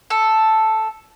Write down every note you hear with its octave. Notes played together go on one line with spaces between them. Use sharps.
A4